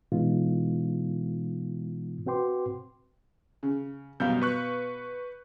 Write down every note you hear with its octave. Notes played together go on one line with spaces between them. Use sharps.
B2 E3 G#3 B3 D#4 F4
C4 F#4 B4 G5 C6 D6
C#3
F#2 B2 G3 F5 G6
B4 C#6 F#6